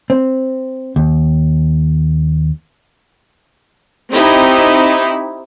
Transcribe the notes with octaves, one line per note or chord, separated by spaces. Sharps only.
C4
D#2
C4 D#4 E4 G4